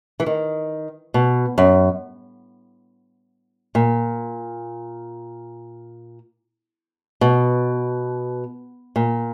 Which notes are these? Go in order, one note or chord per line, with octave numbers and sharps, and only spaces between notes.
E3
D#3
B2
F#2
A#2
B2
A#2